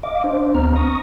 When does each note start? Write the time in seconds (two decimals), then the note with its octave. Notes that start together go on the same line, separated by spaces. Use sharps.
0.03 D#5 F5 D6
0.24 D4 C5
0.54 D2 B3 C4 A#5 F6
0.76 C#6 D#6 A#6